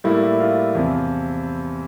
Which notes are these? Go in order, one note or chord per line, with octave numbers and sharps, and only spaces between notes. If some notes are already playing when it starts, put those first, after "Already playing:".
A2 G3 A#3 E4
F4
E2 C3 F3